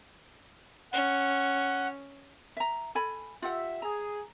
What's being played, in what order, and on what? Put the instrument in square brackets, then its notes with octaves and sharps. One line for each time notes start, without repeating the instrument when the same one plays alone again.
[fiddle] C#4 [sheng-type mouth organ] F#5
[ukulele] E5 A#5
A4 G#5 B5
[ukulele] F4 G4 F#5 [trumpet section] E5
[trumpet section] G#4 [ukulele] A#5